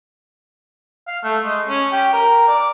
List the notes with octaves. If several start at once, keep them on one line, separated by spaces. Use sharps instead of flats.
F5
A3
G#3
C#4
G4
A#4
D5